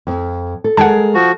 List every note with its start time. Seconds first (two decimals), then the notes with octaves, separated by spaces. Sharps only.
0.07 F2
0.64 A4
0.77 G#3 G#4 A#4 F#5 A5
1.15 F3 F#4